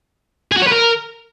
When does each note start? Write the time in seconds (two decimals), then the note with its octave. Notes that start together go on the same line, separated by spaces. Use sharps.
0.52 G#4
0.57 F#4
0.62 C#5
0.67 B4
0.72 A#4